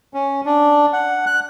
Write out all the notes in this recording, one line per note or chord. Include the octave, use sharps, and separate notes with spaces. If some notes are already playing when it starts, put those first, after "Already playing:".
C#4
D4
F#5
F#6